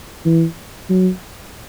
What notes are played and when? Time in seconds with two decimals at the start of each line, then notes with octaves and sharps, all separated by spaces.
0.25 E3
0.89 F#3